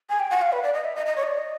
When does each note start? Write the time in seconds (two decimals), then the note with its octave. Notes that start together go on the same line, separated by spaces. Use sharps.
0.09 G#5
0.20 G5
0.31 F#5
0.42 F5
0.52 B4
0.63 D5
0.74 D#5
0.85 E5
0.96 D#5
1.06 D#5
1.16 C#5
1.23 D#5
1.28 D5
1.38 D#5